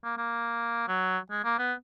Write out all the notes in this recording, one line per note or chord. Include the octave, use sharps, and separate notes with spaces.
A#3
A#3
F#3
G#3
A#3
B3